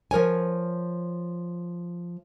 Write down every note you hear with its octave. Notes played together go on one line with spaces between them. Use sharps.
F3 A#4 C#5 G#5